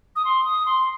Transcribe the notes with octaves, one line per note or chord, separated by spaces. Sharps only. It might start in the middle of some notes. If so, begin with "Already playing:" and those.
D#6
C6
D#6
C6